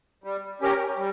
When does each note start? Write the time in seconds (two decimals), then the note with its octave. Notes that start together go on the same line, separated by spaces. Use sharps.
0.24 G3
0.61 C#4 G4 A#4
0.97 G3